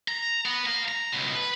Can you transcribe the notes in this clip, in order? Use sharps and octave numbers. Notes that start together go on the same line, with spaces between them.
A#5
B3
F5 A#5
A#5
C#2 B2
B4